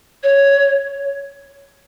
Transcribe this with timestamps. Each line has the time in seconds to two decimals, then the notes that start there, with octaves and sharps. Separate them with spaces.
0.24 C#5